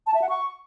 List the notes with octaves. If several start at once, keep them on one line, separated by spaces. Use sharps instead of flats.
A5
E5
F#5
C#6